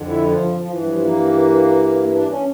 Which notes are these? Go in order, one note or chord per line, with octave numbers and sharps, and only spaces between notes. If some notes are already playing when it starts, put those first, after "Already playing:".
Already playing: F2 D3
E4
F3
F3
G2 E3
G3
F3
A#3
D4
C#4